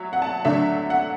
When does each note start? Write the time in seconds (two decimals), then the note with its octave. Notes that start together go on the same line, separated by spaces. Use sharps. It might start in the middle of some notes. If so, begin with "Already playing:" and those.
Already playing: F#3 E5
0.13 F#5
0.22 A5
0.45 D3 F#3 A3 D4 E5
0.90 F#5